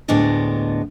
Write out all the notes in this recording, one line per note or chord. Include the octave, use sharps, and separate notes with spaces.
D2 A2 G#3 B3 D4 D#5